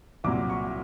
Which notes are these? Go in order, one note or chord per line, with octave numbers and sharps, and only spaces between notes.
C2 A#2 F#3 D6
C#6